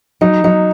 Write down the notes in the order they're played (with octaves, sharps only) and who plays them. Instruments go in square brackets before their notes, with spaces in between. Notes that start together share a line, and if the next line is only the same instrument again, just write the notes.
[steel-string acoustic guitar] F#3 [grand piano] D#4
[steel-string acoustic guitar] F#3 [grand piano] D#4